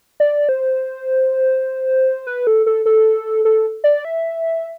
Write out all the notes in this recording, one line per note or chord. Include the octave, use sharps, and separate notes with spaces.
D5
C5
B4
A4
A4
A4
A4
D5
E5